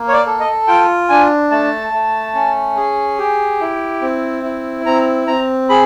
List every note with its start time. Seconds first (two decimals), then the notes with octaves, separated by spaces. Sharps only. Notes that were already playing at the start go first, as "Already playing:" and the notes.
Already playing: A#3
0.08 C#5
0.13 D5
0.26 A4
0.40 D#5
0.68 F4 G5
1.09 D4 G#5
1.51 A3 A5
1.93 A3
2.35 C#4
2.76 G#4
3.18 G4
3.61 E4
4.02 C4
4.44 E4
4.86 C4 A#5
5.27 C4 A#5
5.69 G#4 B5